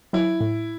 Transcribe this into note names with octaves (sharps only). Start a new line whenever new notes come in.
F#3 E4
A2